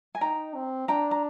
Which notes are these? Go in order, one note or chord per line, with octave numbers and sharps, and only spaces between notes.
G#5
D#4 G5 A#5
C4
D4 G5 A#5
A#5